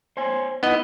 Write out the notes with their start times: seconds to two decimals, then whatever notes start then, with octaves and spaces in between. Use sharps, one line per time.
0.17 C5 C#5 G#5
0.63 B3 D#4 E4 D#5